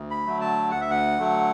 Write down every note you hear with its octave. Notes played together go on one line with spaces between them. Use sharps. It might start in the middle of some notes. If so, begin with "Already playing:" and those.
Already playing: D2
B5
D3 F#3 A3
A5
D2 F#5
E5
F#5
D3 F#3 A3